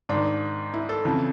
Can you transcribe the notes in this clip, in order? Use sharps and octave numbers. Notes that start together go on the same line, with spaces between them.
G#2 D#3 D4
E4
A4
F2 C#3 E3